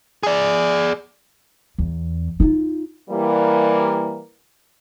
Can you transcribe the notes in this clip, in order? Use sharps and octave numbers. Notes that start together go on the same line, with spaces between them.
G#4 D5
E2
D#4 F4
E3 G3 A#3